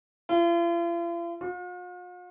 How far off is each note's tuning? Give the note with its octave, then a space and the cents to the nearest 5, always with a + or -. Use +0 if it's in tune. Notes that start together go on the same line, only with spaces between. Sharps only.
F4 -45
F4 +45